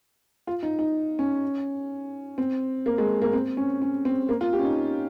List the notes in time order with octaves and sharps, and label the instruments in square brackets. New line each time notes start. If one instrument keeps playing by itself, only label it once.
[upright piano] F4
D#4
D#4
C#4
C4
A#3
G#3
A#3
C4
C#4
C#4
C4
A#3
F4
G4
C#4
D#4